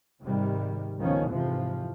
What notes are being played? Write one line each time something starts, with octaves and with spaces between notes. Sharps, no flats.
G#2 C3 D#3 G3
C#2 D#3 F3 B3 C#4
F2 G#2 C3 E3 F3